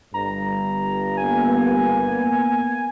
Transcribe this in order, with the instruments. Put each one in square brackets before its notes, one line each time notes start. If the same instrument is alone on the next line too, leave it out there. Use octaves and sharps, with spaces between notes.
[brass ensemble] G1 G2 [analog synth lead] A#5
[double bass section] A#3 B3 [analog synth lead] G#5